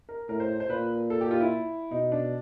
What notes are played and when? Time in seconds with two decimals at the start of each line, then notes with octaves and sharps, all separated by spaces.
0.09 A#4
0.29 A2 A#4
0.40 C5
0.60 C5
0.70 A#2 B4
1.10 A4
1.21 G4
1.31 F4
1.41 E4
1.91 B2 D#4
2.12 D4